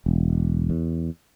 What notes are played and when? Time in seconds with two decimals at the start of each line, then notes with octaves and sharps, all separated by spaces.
0.06 E1
0.70 E2